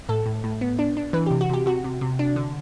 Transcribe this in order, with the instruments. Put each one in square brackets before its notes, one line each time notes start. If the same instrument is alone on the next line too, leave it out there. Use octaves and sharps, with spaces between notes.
[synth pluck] A2 A4
A2
A2
B3
D4
D4
E3 B4
G4
C3
F#4
C3 G4
C3 F#4
C3
C3
D4
D3